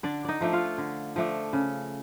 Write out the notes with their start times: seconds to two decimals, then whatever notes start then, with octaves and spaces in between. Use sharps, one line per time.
0.03 D3 D4 D5
0.25 D#4 D5 D#5
0.41 F3 A3 D4
0.53 F4 F5
0.78 D3
1.16 F3 A3 D4
1.53 C#3